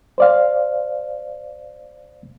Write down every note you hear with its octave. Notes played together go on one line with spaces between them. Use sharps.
C5 D5 F5